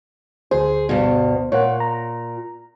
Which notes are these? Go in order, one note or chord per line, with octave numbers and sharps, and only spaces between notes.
D2 G#4 C5
G2 B2
A#2 C#5 F#5
A#5